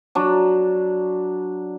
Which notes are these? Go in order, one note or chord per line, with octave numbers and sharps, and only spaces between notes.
F#3 D4